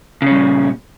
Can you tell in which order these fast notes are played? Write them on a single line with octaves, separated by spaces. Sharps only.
C#3 C#4 G3 A#2